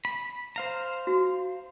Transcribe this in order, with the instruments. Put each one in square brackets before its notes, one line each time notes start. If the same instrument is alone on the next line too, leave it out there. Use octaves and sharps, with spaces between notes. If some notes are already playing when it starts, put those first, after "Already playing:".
[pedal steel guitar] B5
C5 F5 A#5
[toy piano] F#4